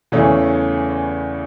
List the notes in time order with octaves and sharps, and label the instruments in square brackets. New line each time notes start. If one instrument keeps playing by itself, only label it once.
[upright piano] E2 C#3 E3 A3 C#4